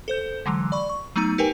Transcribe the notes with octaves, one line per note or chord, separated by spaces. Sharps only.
A4 C5 G6
D3 E3 F#3 G#3
D5 B5 C#6
C#6
F#3 A3 B3 D#4 A#5 D#7
D#4 G4 A#4 B4 G5 G#5